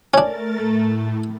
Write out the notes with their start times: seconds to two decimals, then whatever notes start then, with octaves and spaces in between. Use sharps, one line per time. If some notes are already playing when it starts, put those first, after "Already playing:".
0.14 A3 C#4 D4 A#4 A6
0.56 A2 A3